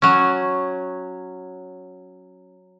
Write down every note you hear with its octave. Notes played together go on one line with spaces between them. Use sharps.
F#3 C#4